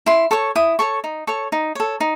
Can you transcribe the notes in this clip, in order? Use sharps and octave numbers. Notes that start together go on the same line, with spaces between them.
E4 C6
A4 C#5 C#6
E4 D#6
A4 C#5 C#6
D#4
A4 C#5 C#6
D#4
A4 C#5
D#4